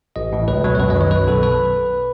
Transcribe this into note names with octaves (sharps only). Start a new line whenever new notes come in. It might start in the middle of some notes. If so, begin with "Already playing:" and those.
A1 D#5
A2 E3
C#2 B4
B2 F#3
C#5
F#2 B4
D#5
D#3 F#3 C#5
B1 B4
B2 F#3 A4
B4